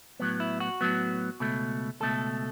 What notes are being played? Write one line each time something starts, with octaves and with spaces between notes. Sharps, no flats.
A2 F#3 B3
E4
F#4
A2 F#3 B3
C#2 B2 A3
C#2 B2 A3 A4